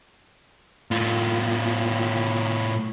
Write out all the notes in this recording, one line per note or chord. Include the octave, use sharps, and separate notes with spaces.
A2 F4